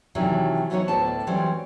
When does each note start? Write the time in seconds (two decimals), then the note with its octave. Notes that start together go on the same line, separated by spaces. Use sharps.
0.15 C3 D#3 E3 F#3 D4
0.70 E3 F#3 B3 D#4 F#4 C#5
0.88 D2 A2 B3 D4 C5 A5
1.27 E3 F#3 G3 C4